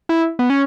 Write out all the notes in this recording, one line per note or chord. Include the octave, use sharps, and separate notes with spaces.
E4
B3
C#4